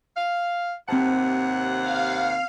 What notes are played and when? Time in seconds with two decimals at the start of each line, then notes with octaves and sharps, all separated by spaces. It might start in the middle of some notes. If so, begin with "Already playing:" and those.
0.17 F5
0.89 D#2 C3 C4 F#5 A5
1.81 F5